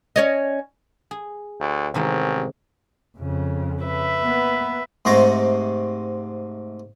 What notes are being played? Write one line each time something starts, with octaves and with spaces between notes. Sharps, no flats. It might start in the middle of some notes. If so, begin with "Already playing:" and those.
C#4 C#5 D#5
G#4
D2
A1 C3 D#3 G#3
F2 C#3
B4 E5
A#3 B3
G#2 C3 A3 A#5